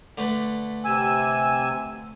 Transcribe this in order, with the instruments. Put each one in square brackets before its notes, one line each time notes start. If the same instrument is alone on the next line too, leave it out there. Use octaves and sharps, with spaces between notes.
[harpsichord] D3 A3 B4
[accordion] C3 G#5 E6